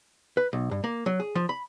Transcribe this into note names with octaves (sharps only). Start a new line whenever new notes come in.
B4
B1
G2
A#3
F#3
G#4
F3
B5